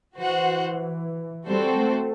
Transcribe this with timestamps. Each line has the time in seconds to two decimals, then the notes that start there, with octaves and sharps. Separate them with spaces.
0.17 E3 F#4 C5 F#5
1.46 G3 C4 F#4 A4 C5
1.77 A3